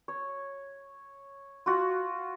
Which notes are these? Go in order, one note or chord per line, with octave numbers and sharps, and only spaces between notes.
C#5
F4 F#4